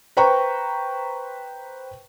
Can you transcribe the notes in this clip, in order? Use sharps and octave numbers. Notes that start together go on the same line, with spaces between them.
B4 C5 G5 A#5 C#6